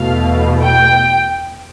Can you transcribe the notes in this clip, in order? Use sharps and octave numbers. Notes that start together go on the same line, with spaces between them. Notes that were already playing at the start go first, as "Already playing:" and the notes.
Already playing: E2 B2 A3 F5
G5